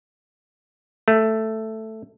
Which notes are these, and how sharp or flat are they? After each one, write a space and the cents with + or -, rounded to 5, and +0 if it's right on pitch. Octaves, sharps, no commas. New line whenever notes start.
A3 +5